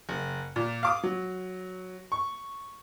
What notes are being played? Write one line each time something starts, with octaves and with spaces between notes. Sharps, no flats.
F#1
A#2
F5 D6 D#6
F#3
C#6